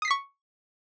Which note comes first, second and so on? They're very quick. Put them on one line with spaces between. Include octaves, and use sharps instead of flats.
D#6 C7 B6 C#6